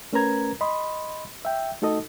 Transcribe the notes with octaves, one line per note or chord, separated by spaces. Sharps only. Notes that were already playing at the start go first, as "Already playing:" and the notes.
A3 C#4 A#4 B4 A#5 G#6
D#5 B5 C6
E5 G5
A3 D#4 F#4 A4 D#5